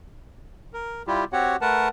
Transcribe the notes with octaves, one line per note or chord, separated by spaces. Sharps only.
A#4
G3 E4 F4 G4
C4 F#4 G4 C#5 F#5
A3 A#4 B4 F#5 A5